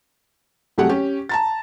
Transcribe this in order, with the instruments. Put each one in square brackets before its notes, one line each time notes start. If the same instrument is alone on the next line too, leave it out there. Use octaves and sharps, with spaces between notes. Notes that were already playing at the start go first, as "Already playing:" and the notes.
[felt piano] C2 F#3 A3 G4 G#4 F#5
C#4 G4
A5 A#5 A6